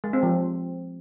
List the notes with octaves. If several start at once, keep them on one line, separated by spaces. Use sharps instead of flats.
G#3
C4
F3